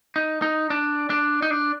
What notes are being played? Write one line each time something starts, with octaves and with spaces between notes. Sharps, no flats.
D#4
D#4
D4
D4
D#4
D4